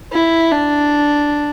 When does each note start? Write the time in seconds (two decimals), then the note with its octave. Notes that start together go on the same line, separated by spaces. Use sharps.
0.13 E4
0.52 D4